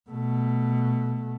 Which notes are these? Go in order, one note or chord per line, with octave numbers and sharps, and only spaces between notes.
B2 A3